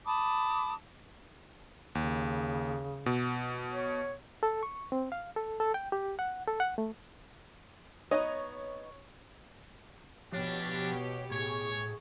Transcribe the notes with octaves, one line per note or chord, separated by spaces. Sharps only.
A5 B5 D6 D#6
D#2 C#3
B2
C#5
A4
C#6
C4
F5
A4
A4
G5
G4
F#5
A4
F#5
A3
B3 D#4 C#5 D#5
B2 F3 C#4 D4 G4 C#5
A2 G#4 C#5 C#6